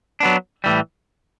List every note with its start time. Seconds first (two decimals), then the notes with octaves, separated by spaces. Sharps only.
0.20 F#3 B3 D4
0.64 A2 E3 G3